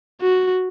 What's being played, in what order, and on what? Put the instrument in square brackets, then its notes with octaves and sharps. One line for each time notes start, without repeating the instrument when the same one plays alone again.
[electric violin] F#4